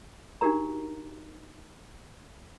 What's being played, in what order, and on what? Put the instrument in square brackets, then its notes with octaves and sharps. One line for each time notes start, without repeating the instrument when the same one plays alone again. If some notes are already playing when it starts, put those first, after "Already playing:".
[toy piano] D4 D#4 F#4 G4 A#4 A#5